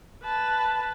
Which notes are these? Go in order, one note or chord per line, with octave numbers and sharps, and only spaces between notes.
B4 A5